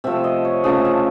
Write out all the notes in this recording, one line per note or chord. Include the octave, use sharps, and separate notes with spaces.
C3 F3 A3 E5
D#5
C#5
C#3 F3 A3 D#5
E5